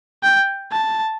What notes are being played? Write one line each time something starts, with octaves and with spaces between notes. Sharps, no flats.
G5
A5